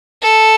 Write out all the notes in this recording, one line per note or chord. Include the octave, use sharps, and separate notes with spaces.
A4